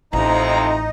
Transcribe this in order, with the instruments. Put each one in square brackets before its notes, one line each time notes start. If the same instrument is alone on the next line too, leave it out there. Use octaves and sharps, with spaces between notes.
[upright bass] A1 [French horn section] F2 C3 [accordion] D#4 [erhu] A#5